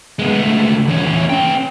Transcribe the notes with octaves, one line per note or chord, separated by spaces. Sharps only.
G#3 B3
C#2 A3
E2 C#4
C#4 G5